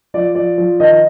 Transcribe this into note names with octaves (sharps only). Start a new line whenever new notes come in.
F3 D5
F3 D5
F3
D#3 D#5